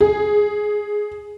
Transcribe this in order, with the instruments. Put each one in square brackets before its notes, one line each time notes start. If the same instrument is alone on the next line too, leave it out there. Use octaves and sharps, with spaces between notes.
[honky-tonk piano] G#4